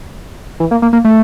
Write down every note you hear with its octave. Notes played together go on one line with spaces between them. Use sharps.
E3
A#3
A#3
A#3
A3